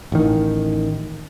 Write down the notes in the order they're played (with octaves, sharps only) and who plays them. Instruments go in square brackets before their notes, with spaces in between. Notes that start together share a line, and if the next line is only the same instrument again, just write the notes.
[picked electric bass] A1 D#3